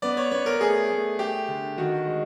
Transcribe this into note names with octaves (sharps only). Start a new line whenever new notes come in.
B3 D5
C#5
B3 C#5
A#4
A3 G#4
A3
A3 G4
D3
D#3 F#4
G#3